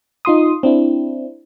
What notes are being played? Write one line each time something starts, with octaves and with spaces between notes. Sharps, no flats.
D#4 F4 C6 D#6
C4 D4 E4